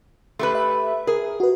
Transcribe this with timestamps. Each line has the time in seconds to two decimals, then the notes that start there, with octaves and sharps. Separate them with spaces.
0.39 A3 G4 B4 C6
0.55 E5
1.07 G#4 A#4
1.40 F#4 B4